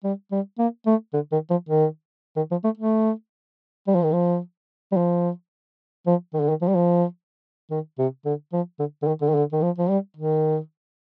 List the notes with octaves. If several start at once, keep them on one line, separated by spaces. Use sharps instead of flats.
G3
G3
A#3
A3
D3
D#3
F3
D#3
D#3
F3
A3
A3
G3
F3
D#3
F3
G3
F3
F3
D#3
D3
D#3
F3
G3
F3
D#3
C3
D3
F3
D3
D3
D#3
D3
D#3
D3
D#3
F3
F3
G3
D#3